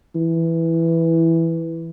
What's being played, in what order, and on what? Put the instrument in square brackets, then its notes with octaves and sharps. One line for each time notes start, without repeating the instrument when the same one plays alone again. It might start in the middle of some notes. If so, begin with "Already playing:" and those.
[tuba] E3